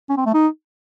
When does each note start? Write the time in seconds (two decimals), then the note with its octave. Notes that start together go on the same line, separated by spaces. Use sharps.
0.10 C#4
0.18 C4
0.26 A3
0.34 D#4